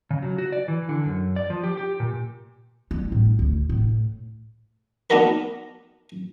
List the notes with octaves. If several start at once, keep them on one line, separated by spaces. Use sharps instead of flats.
C#3
F#3
F#4
D5
E3
D3
F#2
D5
F3
G4
G4
A#2
G3
A2
D2
A2
B3 D4 D#4 F#4 A#4 B4